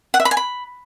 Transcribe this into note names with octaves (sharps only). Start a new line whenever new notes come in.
F#5
E5
B5
G#5
B5